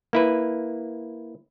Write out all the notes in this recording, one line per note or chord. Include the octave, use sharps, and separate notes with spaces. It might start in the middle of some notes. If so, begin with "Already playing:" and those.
A#3 E4 B4